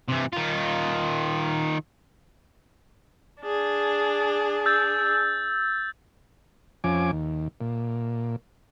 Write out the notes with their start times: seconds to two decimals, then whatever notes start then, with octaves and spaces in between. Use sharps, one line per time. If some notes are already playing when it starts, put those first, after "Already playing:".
0.08 C3 E3
0.33 D#3 F4
3.41 D4 G#4
4.66 E6 G6 A6
6.84 F2 F3 C#4 G#5 D6
7.12 D#2
7.61 A#2